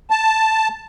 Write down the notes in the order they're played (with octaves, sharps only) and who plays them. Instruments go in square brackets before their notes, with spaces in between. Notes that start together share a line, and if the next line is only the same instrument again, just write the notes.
[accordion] A5